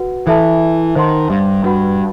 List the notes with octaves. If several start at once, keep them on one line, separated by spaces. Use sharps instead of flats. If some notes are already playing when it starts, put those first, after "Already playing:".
Already playing: F#4 B4 F#5
E3 A4 E5 A5
D#3 C5 F#5 A5 C6
G2
G2 F#4 B4 F#5 B5